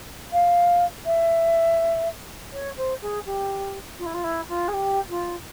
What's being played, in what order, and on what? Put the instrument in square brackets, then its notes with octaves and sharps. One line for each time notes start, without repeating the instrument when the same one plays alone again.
[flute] F5
E5
C#5
C5
G#4
G4
F4
E4
F4
E4
F4
G#4
G4
F4